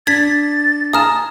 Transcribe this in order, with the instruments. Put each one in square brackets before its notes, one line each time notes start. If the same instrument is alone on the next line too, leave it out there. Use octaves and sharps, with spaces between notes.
[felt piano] D4 [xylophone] G#6 B6 [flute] A6
[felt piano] G#5 [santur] A#5 [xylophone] D#6 F6 E7